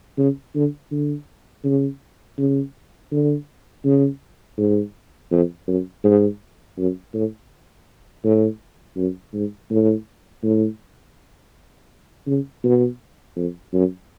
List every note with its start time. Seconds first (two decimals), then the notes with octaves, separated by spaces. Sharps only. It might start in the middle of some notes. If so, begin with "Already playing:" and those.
0.18 C#3
0.55 D3
0.91 D3
1.64 C#3
2.38 C#3
3.11 D3
3.84 C#3
4.58 G#2
5.31 F2
5.67 F#2
6.04 G#2
6.78 F#2
7.14 A2
8.24 A2
8.96 F#2
9.34 G#2
9.70 A2
10.43 A2
12.27 C#3
12.64 B2
13.36 F2
13.73 F#2